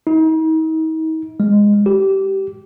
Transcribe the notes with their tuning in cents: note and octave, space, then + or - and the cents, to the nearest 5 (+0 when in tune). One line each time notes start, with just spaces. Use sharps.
D#4 +40
G#3 -10
G4 -20